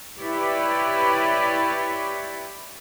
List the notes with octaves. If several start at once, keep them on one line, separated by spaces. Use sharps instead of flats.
E4 G4 B4 C#5 D5